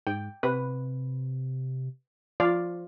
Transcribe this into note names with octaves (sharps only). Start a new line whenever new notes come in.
G#2 G5
C3 B4
F3 F4 D5 F5